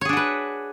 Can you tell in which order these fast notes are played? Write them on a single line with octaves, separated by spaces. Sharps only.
C#5 G#4 D4 F#4 B4